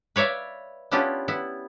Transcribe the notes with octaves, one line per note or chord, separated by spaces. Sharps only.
B4 C#5 D5 E5 F5
B3 C#4 D4 E4 F4 G4
B3 E4